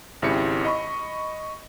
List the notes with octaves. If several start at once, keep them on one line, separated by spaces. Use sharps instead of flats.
G#1 C#3 E4 G4 C#7
D#5 B5 C#6